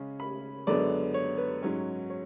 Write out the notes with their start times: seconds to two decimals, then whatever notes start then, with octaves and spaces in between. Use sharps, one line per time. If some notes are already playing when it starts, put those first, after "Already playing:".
Already playing: C#3 G#3 C#4
0.20 B5
0.67 F#2 D3 G#3 B3 D5
1.14 C#5
1.38 B4
1.62 G#2 F#3 C#4 C#5
2.10 C#5